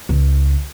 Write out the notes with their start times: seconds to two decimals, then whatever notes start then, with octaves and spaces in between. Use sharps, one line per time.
0.09 C#2